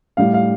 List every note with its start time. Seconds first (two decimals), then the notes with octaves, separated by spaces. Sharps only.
0.17 A2 G3 F5
0.34 F5